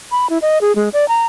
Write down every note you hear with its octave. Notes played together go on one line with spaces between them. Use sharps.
B5
E4
D#5
G#4
G#3
D5
A#5